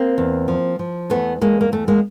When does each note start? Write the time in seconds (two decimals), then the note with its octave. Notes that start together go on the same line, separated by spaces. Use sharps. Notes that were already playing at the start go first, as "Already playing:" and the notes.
Already playing: A#3 C4
0.18 E2
0.48 F3
0.79 F3
1.10 E2 A3 B3
1.41 E2 G#3 A#3
1.61 A#3
1.72 E2 A3
1.88 G#3 A#3